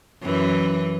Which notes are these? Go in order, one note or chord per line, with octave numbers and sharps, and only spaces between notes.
F#2 E3